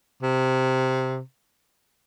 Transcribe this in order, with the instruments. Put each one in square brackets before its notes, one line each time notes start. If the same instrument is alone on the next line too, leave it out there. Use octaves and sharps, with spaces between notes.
[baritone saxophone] C3